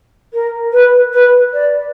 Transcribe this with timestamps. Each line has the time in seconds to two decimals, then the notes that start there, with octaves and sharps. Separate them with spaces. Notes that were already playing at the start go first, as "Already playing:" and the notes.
0.33 A#4
0.72 B4
1.13 B4
1.52 D5